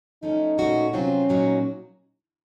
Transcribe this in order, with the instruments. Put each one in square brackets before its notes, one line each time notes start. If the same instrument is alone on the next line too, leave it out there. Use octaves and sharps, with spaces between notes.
[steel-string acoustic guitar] F3 A3 C#4 [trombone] D#4
[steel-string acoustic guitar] A#2 A3 C#4 F#4
[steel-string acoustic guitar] C3 F#3 C4 F4 [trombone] C#4
[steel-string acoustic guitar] A#2 F#3 A#3 D#4 F#4